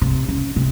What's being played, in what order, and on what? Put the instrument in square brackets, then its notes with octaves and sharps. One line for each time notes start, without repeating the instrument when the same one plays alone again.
[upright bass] C3
C#3
C3